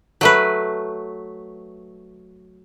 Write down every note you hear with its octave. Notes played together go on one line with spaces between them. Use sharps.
F#3 A3 B4